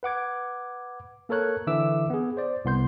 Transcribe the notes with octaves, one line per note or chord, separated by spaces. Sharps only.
B4 F#5 D6 G#6
A#3 A4 A#4 C#5 F#6
D3 E3 E5 D6 E6
B3 G#4
C5 D5
C2 B3 C6 G6